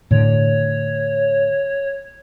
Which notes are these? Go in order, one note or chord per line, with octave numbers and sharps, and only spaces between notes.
A2 D3 C#5